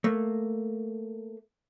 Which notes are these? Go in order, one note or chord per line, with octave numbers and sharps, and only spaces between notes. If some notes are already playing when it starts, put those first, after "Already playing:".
A3 A#3